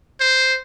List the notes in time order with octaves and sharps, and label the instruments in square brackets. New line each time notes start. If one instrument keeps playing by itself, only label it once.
[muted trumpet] C5